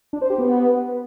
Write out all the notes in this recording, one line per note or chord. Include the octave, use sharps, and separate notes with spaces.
D4
C5
G4
B3